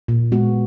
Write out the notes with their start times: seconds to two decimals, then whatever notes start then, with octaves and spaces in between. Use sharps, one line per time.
0.08 A#2
0.32 G#3 B3 F#4